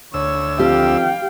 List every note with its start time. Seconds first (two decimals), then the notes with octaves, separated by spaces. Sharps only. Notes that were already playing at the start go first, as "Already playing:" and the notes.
0.14 D2 C#5 E6
0.59 F2 G4 F5 G5